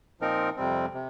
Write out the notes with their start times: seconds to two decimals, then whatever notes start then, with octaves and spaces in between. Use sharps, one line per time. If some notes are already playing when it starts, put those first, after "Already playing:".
0.21 A#2 F3 C4 D#4 A#4
0.56 F2 C3 G3 C4
0.94 C3